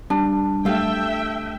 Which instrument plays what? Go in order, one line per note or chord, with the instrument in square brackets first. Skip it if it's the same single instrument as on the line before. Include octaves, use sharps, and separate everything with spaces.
[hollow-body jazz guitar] G3 [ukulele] D4
[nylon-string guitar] A3 G4 F5 [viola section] E5 G5